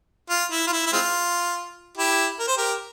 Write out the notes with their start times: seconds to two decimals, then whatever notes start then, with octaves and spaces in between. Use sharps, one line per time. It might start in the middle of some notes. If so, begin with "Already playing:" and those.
0.30 F4
0.51 E4
0.67 F4
0.73 E4
0.86 E4
0.93 G#3 C4 F4
1.97 E4 G4
2.39 A#4
2.47 C5
2.57 G4 A#4